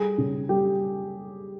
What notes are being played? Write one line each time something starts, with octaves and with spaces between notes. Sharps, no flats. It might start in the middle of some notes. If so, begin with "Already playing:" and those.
Already playing: G3 G#4
C#3
G3 G4